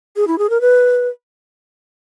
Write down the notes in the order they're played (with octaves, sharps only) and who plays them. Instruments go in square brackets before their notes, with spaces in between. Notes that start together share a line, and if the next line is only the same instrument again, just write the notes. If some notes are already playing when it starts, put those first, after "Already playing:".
[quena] G#4
E4
G#4
A#4
B4